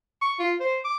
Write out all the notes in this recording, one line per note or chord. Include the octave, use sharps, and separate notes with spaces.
C#6
F4
C5
D6